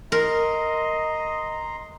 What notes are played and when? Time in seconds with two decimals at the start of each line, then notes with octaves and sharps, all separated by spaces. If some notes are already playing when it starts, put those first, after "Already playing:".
0.12 A#4 D#5 A#5 C6